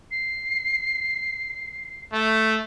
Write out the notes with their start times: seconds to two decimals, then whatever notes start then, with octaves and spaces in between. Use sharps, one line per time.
0.11 C7
2.13 A3